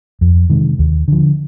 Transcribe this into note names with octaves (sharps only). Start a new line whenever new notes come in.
F2
C3 D#3 G#3
D#2
D3 F3